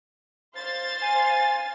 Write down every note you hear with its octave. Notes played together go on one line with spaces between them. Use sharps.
C5 F5 A6
G#5